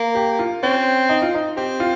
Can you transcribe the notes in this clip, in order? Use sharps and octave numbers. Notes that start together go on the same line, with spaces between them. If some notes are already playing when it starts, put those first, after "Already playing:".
Already playing: A#3
G4
F4
C4 C#4
D#4
F4
D#4
C4 G4
F4